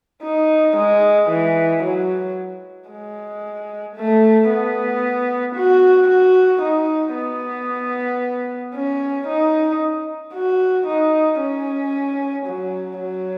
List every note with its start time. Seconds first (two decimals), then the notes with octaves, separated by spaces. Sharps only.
0.23 D#4
0.77 G#3
1.30 E3
1.83 F#3
2.90 G#3
3.96 A3
4.49 B3
5.56 F#4
6.08 F#4
6.62 D#4
7.15 B3
8.75 C#4
9.28 D#4
10.34 F#4
10.87 D#4
11.41 C#4
12.47 F#3
13.00 F#3